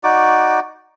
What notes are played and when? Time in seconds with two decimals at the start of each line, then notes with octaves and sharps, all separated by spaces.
0.04 D#4 F#4 D5 D6